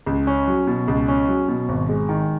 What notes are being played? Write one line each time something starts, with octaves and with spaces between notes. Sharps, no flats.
C#2
C#4
F#3
B2
C#2
C#4
F#3
B2
G#1
G#3
D#3